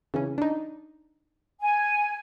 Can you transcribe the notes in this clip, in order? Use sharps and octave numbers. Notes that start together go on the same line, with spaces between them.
C#3 E3 C#4
D4 D#4
G#5